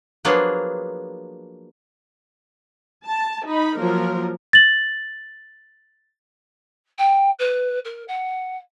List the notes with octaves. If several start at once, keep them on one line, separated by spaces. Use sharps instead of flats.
F3 F#3 A#3 B3 D4 G#4
A5
D#4 B5
F3 F#3 A#3 A#4
A6 F#7
G5
B4
A#4
F#5